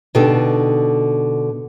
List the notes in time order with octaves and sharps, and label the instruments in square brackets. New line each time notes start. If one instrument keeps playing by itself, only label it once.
[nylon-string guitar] B2 D3 D#4 G4 A4